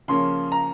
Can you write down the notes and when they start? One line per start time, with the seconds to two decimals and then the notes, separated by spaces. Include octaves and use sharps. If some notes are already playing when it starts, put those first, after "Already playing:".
0.08 C#3 F3 A#3 C#4 C6
0.52 A#5